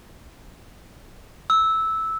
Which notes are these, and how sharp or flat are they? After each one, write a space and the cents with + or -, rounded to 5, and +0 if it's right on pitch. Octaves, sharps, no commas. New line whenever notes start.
E6 -10